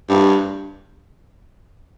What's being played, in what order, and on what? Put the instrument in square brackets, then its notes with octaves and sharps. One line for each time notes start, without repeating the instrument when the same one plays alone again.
[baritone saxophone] G2